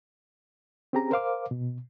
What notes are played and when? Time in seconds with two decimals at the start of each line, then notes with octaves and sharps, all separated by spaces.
0.93 C4 C#4 G4 G#4 A#5
1.11 A#4 C5 F5 D6
1.51 B2